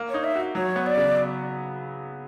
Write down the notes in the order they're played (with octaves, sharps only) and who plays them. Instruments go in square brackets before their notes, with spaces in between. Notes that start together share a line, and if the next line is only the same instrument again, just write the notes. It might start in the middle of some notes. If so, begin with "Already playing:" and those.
Already playing: [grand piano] A#3
[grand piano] D#4 [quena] C#5
[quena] E5
[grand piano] F#4
[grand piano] F#3 [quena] C#5
[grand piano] B3
[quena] D5
[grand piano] C#3